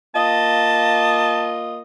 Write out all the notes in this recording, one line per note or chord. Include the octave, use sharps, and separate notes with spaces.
A#3 F4 D#5 A5